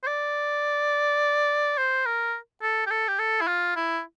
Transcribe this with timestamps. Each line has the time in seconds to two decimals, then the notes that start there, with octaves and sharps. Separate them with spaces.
0.03 C5
0.07 D5
1.78 C5
2.06 A#4
2.62 A4
2.86 G4
2.91 A4
3.08 G4
3.19 A4
3.41 E4
3.47 F4
3.76 E4